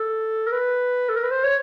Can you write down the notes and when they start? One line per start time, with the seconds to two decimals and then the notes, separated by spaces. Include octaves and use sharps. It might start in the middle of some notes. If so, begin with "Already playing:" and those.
Already playing: A4
0.47 A#4
0.52 B4
1.09 A4
1.17 A#4
1.24 B4
1.31 C5
1.44 C#5